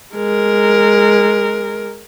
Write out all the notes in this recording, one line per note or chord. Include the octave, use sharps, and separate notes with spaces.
G#3 A#4